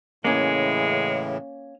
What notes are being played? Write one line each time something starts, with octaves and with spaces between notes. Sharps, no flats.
A2 C#3 E3 G#3 A#3 C#4